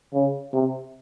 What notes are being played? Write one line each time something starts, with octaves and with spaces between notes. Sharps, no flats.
C#3
C3